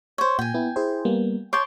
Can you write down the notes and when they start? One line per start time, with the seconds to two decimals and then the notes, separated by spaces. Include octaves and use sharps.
0.18 C5 C#5
0.39 A#2 G5 G#5
0.54 B3 E4
0.76 E4 G#4 C5
1.05 G3 A#3 B3
1.53 C#5 A5 C6 D6 G6